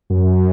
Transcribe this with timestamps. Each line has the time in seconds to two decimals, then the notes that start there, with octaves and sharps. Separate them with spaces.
0.10 F#2